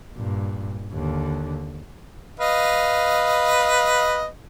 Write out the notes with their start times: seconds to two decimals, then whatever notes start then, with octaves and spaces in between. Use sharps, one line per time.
0.14 G2 A#2
0.93 D#2 D3
2.40 B4 D#5 F5